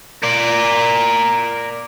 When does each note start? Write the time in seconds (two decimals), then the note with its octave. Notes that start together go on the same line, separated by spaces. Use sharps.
0.23 A#4 D5